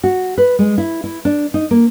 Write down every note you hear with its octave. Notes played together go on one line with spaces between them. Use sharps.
F#4
B4
G#3
E4
E4
D4
D#4
A#3